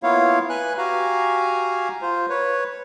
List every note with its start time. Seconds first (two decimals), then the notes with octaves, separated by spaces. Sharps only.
0.03 A#3 B3 E4 F4 C#5 F5
0.49 B4 G#5 F#6
0.78 F#4 G4 F5 G#5 A#5
2.02 F4 C5
2.29 B4 C#5